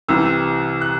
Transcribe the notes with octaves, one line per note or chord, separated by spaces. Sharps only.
C2 C3 E3 E6
F#6